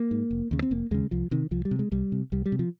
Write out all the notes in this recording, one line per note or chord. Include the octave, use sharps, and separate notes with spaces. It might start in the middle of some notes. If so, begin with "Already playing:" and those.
Already playing: A#3
G#2
F1
D#2 C#3
C4
F1 A#3
D#2 C#3 G#3
C2 F3
C3 D#3
C2 F3
G3
C3
G#3
C2 G3
C3
C2 G3
G3
C3
F3